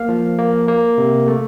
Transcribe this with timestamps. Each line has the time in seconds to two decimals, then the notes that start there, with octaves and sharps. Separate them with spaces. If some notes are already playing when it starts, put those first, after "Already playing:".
Already playing: A#3 F5
0.09 F3
0.38 A#3
0.68 A#3
0.98 C3
1.28 A3